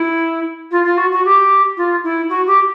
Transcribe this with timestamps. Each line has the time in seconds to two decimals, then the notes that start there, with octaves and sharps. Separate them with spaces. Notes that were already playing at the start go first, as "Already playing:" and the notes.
Already playing: E4
0.71 F4
0.85 F4
0.98 F#4
1.12 F#4
1.25 G4
1.77 F4
2.03 E4
2.29 F#4
2.47 G4